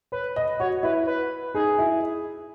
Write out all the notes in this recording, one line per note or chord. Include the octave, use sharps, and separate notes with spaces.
B4 C#5
D#5
F#4 C#5
E4 B4
B4
D#4 G#4
E4